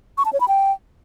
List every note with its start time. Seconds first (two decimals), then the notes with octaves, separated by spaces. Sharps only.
0.18 C#6
0.25 A5
0.33 C#5
0.41 B5
0.48 G5